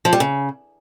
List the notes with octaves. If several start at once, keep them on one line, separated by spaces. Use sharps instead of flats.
F3
G3
C#3